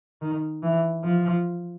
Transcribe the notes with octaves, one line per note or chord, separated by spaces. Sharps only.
D#3
E3
F3